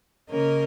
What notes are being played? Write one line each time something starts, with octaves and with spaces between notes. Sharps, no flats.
C#3 A#3 C#4 A#4 D#5